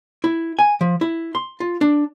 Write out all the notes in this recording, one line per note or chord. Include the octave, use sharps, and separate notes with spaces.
E4
G#5
F3
E4
C6
F4
D4